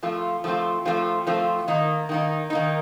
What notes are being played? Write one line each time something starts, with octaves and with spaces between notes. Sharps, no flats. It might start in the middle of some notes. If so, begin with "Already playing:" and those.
F3 A3 C4 F4
F3 A3 C4 F4
F3 A3 C4 F4
F3 A3 C4 F4
D#3 A#3 D#4
D#3 A#3 D#4
D#3 A#3 D#4